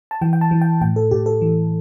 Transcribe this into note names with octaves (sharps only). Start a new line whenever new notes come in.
A5
E3 G5
G5
A5
E3
G5
A2 G5
A4
A2 G4
A4
E3